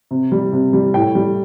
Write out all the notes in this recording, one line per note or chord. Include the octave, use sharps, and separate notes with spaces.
C3
G3
C3
G3
A2 G5
G3